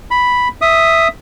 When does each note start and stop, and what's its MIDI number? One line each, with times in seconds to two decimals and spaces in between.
0.11 0.48 83
0.61 1.08 76
0.61 1.08 87